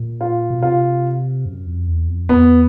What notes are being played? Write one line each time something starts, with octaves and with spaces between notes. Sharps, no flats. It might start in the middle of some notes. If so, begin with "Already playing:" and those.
Already playing: A#2
F4
B2
C3 F4
F#2
F2
E2
F2
E2 B3